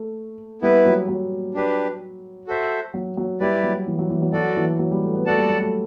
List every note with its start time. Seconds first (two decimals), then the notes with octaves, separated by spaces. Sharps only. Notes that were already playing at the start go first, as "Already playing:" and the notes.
Already playing: A3
0.62 G3 B3 E4 B4
0.85 F#3
1.08 F#3
1.54 D4 G4 B4
2.47 F#4 A4 C5 E5
2.94 F#3
3.17 F#3
3.40 G3 E4 G4 B4 D5
3.63 F#3
3.87 E3
3.99 F#3
4.10 E3
4.22 F#3
4.32 F#3 F#4 A4 D5
4.56 E3
4.79 F#3
4.91 G3
5.03 A3
5.14 B3
5.26 A3 F#4 A4 D5 F#5 A5
5.37 G3
5.50 F#3
5.60 A3